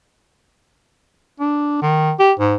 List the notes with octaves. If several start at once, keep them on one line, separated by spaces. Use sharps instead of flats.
D4
D#3
G4
G#2